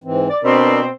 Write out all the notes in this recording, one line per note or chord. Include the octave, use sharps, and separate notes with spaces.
G#2 E3 C4
D5
B2 C4 D4 A#4 D5